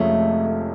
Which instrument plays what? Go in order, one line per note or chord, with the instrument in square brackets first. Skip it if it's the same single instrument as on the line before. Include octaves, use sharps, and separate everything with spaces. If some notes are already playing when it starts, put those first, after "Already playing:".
Already playing: [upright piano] F1 F2 F3 G#3 C#4 [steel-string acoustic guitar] A3